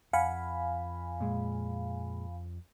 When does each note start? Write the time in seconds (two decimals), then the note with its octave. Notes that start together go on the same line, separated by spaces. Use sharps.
0.13 F2 F5 F#5 G#5 B5
1.20 A#2 G#3